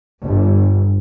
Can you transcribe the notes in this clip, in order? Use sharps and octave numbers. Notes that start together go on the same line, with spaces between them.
G1